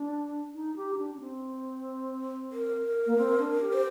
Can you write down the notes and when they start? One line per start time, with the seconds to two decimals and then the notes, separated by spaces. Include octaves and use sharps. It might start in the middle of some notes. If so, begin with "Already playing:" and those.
Already playing: D4
0.55 D#4
0.76 G4
0.94 D#4
0.98 D4
1.14 D4
1.20 C4
2.52 A#4
3.07 A#3
3.18 C4
3.39 D4
3.61 G4
3.73 C5